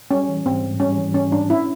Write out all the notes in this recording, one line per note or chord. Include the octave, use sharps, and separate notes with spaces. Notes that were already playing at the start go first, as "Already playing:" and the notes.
G3 C#4
E3
G#2 C4
G#2
G3 C#4
E3
G#2 C#4
G#2 D4
C#4 E4